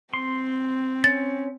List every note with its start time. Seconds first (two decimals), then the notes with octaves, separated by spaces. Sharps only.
0.14 C4 C6
1.04 C#4 A6